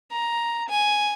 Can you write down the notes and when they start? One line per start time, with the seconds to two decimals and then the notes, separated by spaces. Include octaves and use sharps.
0.11 A#5
0.69 G#5